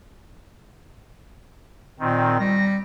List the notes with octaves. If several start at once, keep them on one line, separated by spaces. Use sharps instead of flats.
A#2 D#3 C4
G3 A#6